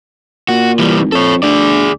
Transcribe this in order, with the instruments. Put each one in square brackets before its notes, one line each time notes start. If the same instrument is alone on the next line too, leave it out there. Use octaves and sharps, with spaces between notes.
[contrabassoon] A#2 [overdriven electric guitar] F#4
[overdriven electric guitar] E3 G3
[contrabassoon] G#1
[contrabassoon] F2 [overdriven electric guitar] A4 C#5
[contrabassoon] D2 [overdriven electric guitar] G#4 D5